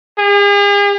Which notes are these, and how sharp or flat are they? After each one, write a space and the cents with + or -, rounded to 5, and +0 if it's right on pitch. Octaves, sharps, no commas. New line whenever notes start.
G#4 -45